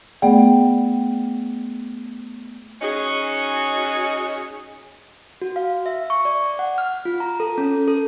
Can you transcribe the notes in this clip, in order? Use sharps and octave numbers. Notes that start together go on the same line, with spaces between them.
A3 B3 G#4 D5 F#5 G5
C#4 D#4 F#4 G#4
F#4
F5
E5
C#6
D5
F#5
F6
F4
A#5
A4
C#4
A4